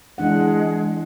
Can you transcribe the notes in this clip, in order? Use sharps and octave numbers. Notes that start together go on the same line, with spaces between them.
E3 G#3 D4 F#5